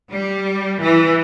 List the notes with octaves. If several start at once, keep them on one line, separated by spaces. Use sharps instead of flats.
G3
E3